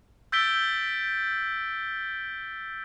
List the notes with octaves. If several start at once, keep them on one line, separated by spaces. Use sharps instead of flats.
E6 G6 A6 B6 D7 G7